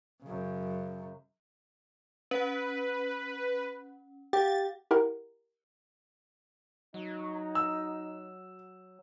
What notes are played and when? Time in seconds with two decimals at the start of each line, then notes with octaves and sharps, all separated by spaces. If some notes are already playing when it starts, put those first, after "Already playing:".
0.23 F#2 C#3
2.31 C#4 B4 F#5
4.33 G4 F5 F#5 A6
4.91 E4 G4 A#4 F#5
6.94 F#3 D#4
7.55 E6